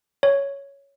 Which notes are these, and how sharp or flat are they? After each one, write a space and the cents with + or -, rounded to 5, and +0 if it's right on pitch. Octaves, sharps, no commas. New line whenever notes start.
C#5 +5